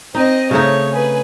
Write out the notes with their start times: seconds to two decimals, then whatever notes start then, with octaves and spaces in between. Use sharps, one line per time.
0.15 C4 D#4 D#5
0.51 C#3 A3 D#4 C#5
0.92 G#4 B4